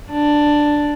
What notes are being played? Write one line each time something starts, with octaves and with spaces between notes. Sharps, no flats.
D4